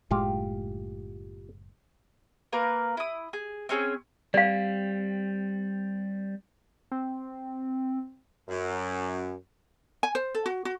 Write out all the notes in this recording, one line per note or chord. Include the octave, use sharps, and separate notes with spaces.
F#1 A2 G#3 F4 G4 F5
A#3 A#4 B4
E4 D#6
G#4
C4 C#4 G#4 C#5
G3 C4 D5 F5
C4
F#2
G#5
C5
A4
F#4
F#4